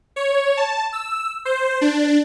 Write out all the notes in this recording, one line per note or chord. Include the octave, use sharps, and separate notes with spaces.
C#5
A5
E6
C5
D4